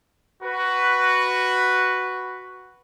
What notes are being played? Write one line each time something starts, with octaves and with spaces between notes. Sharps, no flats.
F#4 B4